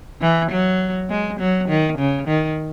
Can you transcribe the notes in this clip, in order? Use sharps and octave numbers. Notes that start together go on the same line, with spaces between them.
E3
F#3
G#3
F#3
D#3
C#3
D#3